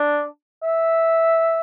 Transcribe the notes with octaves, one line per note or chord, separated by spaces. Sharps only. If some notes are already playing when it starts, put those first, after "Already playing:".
Already playing: D4
E5